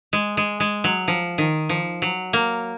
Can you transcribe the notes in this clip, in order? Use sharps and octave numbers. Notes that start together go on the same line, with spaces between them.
G#3
G#3
G#3
F#3
F3
D#3
F3
F#3
A#3